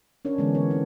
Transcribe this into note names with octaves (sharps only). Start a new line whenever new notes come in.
C#4 D4 A#4 C#5
D3 E3 G#3 B3
E3 A#3 B3 A#4 C#5
C4 D#4